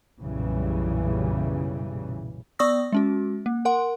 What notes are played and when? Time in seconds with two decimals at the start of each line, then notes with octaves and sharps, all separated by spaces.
0.20 B1 F#2 A#2 C#3 E3 G3
2.59 B3 D5 C#6 D#6 E6 A#6
2.92 G#3 C#4 F#4
3.46 A#3
3.65 A#4 F#5 C6